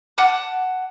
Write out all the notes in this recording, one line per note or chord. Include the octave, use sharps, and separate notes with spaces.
F#5 A5 D6